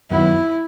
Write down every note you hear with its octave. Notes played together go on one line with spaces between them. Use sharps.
F#2 D#3 F#3 B3 E4 F#4